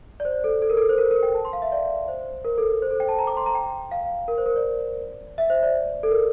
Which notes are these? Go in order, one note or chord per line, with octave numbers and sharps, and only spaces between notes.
D5
C5
A4
A4
A#4
A4
C5
A#4
A#4
G5
A5
C6
F5
E5
D5
C5
A#4
A4
C5
A4
G5
A5
A#5
D6
C6
A#5
G5
F5
A#4
C5
A#4
D5
E5
C5
D5
A4
A#4